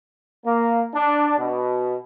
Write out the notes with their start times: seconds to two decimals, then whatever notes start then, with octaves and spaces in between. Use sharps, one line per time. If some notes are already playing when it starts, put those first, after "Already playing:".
0.45 A#3
0.93 D4
1.38 B2